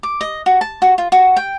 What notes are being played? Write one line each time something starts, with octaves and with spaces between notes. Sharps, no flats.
D6
D#5
F#4
A5
F#4
F4
F#4
G5